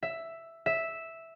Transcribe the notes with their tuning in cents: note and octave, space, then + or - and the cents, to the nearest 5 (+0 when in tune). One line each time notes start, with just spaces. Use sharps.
E5 +5
E5 -5